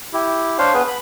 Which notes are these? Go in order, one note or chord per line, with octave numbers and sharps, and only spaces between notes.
E4 G4
D4 C5 C#5 F5
B3 G#4 B4
B5